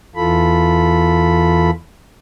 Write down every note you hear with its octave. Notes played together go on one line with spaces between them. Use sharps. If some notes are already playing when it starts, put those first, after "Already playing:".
E2 E3 F4 A4 B5